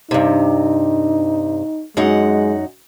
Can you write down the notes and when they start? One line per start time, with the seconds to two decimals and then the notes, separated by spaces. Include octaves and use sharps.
0.11 G2 C3 D#4
1.97 F#2 G#3 D#4 F#5